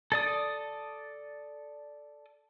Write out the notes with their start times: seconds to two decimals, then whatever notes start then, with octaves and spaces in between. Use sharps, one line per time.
0.12 A4 D5 D#6